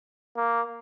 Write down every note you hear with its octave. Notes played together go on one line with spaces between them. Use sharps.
A#3